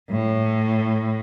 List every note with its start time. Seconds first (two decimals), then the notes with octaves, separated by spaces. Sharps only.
0.10 A2